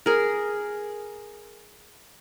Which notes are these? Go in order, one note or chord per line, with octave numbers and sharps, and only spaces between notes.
G#4 A#4